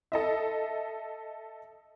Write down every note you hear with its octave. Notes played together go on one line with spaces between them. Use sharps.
A4 D#5 E5